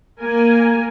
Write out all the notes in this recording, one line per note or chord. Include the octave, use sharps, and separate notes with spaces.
A#3 A#4 G#5